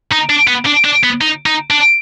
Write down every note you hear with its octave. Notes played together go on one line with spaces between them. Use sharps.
D#4
D4
B3
D4
D4
B3
D#4
D#4
D4